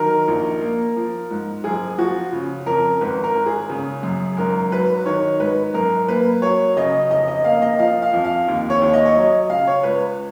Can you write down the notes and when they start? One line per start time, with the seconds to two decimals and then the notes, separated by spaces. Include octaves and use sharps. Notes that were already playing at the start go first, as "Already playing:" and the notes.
Already playing: D#3 F#3 A#4
0.28 A#1
0.61 A#3
0.96 F3
1.31 G#2
1.64 F#1 G#4
1.98 F3 F#4
2.33 C#3
2.66 F2 A#4
3.01 G#1 B4
3.24 A#4
3.35 G#1
3.46 G#4
3.70 C#3
4.03 F#2
4.37 G#1 A#4
4.72 F#3 B4
5.06 D#3 C#5
5.39 G#2 B4
5.74 F#2 A#4
6.08 A#3 B4
6.42 F#3 C#5
6.77 C#3 D#5
7.10 F1 D#5
7.28 D#5
7.44 A#3 F5
7.62 D#5
7.79 F3 F5
8.02 F5
8.13 F2
8.25 F5
8.48 D#2
8.70 C#5
8.81 D#2
8.93 D#5
9.05 C#5
9.15 F#3 D#5
9.49 C#3 F5
9.67 C#5
9.83 C#2 B4